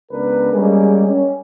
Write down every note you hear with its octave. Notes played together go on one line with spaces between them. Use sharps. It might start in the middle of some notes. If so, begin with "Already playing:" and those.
C#2 B3 D4 A#4 B4
G3 G#3 A#3 C#4 G#4
C#4